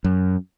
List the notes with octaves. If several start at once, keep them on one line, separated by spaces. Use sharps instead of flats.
F#2